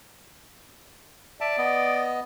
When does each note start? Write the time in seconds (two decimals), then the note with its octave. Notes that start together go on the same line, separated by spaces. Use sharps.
1.41 D5 E5 A5
1.58 B3 D#5